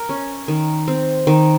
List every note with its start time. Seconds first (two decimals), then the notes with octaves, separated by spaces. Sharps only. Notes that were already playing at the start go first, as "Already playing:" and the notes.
Already playing: A#4
0.09 C#4
0.48 D#3
0.88 C4
1.27 D#3